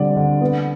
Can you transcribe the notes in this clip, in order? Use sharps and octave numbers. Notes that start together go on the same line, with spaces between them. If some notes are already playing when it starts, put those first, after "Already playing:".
Already playing: D3 G3 C4 D5
D3
B3